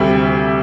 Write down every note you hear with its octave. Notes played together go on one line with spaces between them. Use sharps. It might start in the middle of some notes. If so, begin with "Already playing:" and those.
Already playing: D2 C3 G3 E5